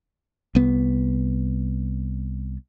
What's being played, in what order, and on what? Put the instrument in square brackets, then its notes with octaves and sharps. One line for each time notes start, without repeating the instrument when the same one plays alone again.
[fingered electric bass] C2 B3